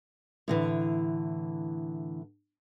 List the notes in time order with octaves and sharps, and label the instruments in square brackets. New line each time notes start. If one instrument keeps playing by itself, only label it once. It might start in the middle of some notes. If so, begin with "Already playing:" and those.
[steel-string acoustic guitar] A2 D3 E3